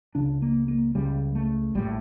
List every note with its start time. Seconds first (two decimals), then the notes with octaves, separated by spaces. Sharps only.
0.15 C#2 C#3 D4
0.42 A#3
0.68 A#3
0.95 C#2 C#3 G3
1.35 A3
1.75 A#1 A2 G3